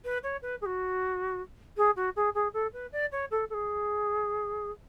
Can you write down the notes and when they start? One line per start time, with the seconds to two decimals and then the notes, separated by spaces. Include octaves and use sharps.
0.04 B4
0.23 C#5
0.42 B4
0.61 G#4
0.65 F#4
1.77 G#4
1.96 F#4
2.16 G#4
2.34 G#4
2.53 A4
2.73 B4
2.92 D5
3.11 C#5
3.31 A4
3.50 A4
3.54 G#4